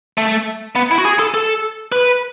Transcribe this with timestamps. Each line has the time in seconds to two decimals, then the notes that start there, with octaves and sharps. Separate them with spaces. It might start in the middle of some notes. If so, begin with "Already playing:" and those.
0.18 A3
0.76 B3
0.91 E4
0.98 F#4
1.05 G#4
1.19 A4
1.34 A4
1.92 B4